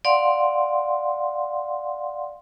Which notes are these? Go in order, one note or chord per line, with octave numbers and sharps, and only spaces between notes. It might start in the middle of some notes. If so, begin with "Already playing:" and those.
D5 F5 F#5 C6